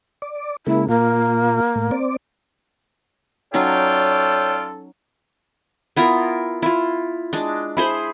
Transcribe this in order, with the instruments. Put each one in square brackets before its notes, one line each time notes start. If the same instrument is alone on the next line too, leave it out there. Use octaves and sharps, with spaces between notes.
[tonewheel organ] D5
[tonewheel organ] C#3 G#3 A#3 [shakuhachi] E4
[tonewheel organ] A#2 F4 [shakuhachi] A#3
[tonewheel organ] A2
C4 D5
[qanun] F#3 C#4 D#4 [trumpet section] F4 D5 G5 [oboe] A4 [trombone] C#5
[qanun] B3 E4 F4 A#4
E4 F4
G#3 D4
E4 G#4 C5 B5